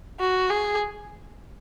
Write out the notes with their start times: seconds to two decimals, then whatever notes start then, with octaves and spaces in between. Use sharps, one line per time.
0.20 F#4
0.50 G#4